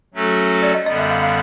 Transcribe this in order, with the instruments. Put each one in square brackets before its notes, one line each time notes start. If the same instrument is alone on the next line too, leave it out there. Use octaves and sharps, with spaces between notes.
[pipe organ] F#3 A3 C#4 F#4 A4
[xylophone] D5
D#5
[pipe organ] F#2 D3 G3 B3 [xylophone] D#5
[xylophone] E5
F5
F5